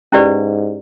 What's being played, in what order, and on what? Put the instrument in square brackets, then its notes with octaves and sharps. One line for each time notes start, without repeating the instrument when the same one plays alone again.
[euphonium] G#2 [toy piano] C#4 E4 G4 B4 D5